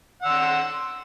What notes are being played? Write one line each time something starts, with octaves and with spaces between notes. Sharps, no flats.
F#5 C6 E6